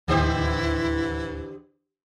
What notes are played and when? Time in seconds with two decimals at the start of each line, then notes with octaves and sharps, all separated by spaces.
0.08 D1 D#2 D3 E3 E4 G4 C5